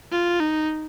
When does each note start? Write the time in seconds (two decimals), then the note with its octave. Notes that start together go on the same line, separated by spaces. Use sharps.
0.11 F4
0.40 D#4